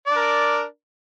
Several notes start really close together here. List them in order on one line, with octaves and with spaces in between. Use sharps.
D5 D4 A#4